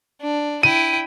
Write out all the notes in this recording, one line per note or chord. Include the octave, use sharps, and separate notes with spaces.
D4
E4 G5 D#7